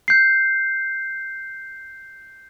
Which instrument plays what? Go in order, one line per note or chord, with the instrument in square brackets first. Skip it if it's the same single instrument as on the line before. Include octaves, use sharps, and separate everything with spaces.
[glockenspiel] G6 C7